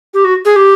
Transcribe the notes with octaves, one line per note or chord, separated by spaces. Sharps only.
G4
F#4
G#4
G4